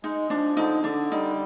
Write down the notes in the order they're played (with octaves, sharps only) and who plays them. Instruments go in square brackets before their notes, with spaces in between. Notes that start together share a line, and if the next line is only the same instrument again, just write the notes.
[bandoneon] G#3 [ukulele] D#4
[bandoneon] F3 [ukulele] D4
[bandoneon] D3 [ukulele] D#4
[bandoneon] D3 [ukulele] D4
[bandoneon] G3 [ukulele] D#4